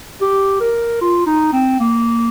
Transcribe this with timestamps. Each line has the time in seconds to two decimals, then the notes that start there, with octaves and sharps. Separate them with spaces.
0.21 G4
0.61 A#4
1.01 F4
1.26 D#4
1.53 C4
1.80 A#3